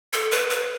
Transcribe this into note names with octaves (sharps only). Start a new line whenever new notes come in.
A4
B4
B4